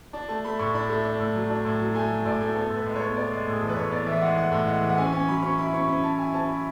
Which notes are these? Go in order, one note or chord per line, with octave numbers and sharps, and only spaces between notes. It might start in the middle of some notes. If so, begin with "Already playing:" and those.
D4
A3 A5
A3 B5
A2 C#6
D4 B5
A3
D4
A2
F#3
D4
A2
F#3
A3 G#5
F#3
A2 D5
A3
B3 A4
A2
B4
G#3
B3 C#5
B3 D5
G#3
A2
G#4
E3 A4
B4
A2 C#5
B3 D5
E3 E5
G#3 F#5
E3 F#5
A2
G#3 F#5
E3
F#5
C#4 G#5
C#4 G#5
F#3 B5
C#4 C#6
E4 B5
C#4 C#6
C#4 B5
E4 A5
E4 G#5
C#4 A5
E4 B5